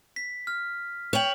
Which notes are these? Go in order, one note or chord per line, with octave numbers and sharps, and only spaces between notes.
B6
F6
C#5 G5 E7 F#7